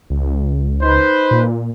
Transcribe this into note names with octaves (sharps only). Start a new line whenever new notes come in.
C#2
D#4 B4 C5
A#2